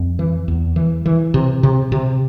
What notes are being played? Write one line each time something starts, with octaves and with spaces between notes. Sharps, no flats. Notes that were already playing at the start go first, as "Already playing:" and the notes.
Already playing: F2
E3
E2
E3
E3
C3
C3
C3